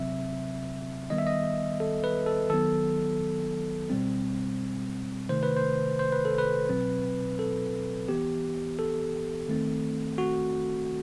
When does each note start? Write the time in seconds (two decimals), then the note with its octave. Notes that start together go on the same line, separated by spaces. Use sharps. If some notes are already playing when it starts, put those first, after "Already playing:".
Already playing: C3 F#3 C4 E5
1.10 D#3 G3 B3 D#5
1.18 E5
1.27 D#5
1.80 A4
2.04 B4
2.26 A4
2.50 D#3 F#3 B3 A4
3.90 B2 G3 C4
5.29 C3 D#3 A3 C5
5.43 B4
5.57 C5
5.99 C5
6.12 B4
6.25 A4
6.38 B4
6.69 B2 F#3 C4
7.39 A4
8.09 E3 B3 G4
8.79 A4
9.49 D#3 A3 C4
10.18 F#4